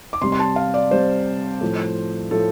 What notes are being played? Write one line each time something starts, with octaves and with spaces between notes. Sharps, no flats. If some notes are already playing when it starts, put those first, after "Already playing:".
D6
C3 G3 C6
C6
A5
F5
D5
C3 G3 C5
A2 F3 A3
A2 F3 A3 A4